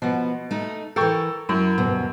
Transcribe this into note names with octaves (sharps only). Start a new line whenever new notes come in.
B2 F3 B3
A3 D#4
E3 A4 A#4 G5 C#6
F#2 E4
D2 G2 B2